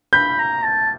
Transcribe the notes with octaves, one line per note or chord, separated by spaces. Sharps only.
B5 G6
A#5
A5